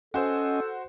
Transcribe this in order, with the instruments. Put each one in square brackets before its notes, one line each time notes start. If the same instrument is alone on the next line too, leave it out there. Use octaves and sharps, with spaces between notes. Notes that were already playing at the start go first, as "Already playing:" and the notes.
[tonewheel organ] C#4 D#5 G#5 [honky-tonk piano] F#4 C5 [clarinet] A4